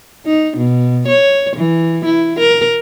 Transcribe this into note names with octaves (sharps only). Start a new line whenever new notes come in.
D#4
B2
C#5
E3
E4
A#4